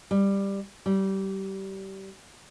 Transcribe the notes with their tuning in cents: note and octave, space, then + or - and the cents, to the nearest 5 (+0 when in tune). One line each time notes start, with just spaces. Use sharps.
G3 +10
G3 -25